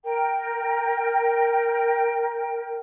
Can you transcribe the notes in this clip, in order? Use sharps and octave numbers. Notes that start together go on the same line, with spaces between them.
A#4 G5